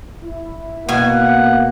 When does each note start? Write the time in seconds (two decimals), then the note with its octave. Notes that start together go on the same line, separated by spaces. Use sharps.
0.24 E4
0.89 B2 A#3 F#5 G#5